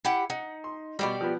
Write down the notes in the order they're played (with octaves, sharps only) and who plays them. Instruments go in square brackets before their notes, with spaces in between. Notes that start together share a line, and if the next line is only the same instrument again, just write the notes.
[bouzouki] E4 G4 F#5
[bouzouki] D#4 [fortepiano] F#5
[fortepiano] C6
[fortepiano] B2 G3 [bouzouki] F#4 G4 D5
[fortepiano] F3 B3